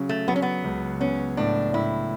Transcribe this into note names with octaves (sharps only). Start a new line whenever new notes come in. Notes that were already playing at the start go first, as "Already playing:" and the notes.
Already playing: C#3 F#3
A3
F#3 B3
C#4
B3
C#2
B3 C#4
A2 D4
A2 E4